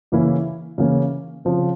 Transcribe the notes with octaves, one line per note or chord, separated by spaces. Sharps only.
C#3 E3 A#3 C#4 E4
C#3 E3 A#3 C#4 E4
C#3 F3 C4